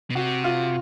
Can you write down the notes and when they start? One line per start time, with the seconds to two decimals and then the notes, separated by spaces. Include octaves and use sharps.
0.10 B2
0.15 C3 F#4
0.44 F4